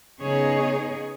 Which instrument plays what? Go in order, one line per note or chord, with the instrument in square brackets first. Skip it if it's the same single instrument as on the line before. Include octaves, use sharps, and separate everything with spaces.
[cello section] C#3 B3 D#4 G#4 C#5